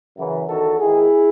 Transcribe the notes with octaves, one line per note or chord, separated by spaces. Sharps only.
F#2 C#3 E3
E2 D#3 F#4 A4
G#2 D#3 E4 G#4